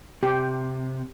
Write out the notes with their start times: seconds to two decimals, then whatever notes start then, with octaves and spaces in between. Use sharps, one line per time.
0.23 C3 G4